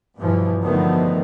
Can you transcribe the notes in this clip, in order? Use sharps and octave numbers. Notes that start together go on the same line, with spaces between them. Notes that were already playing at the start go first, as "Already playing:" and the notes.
G2 B2 E3 F3
D3 D#3 F3 F#3 A3 B3